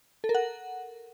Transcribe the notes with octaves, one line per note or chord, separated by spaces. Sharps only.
A4
A#4
F#5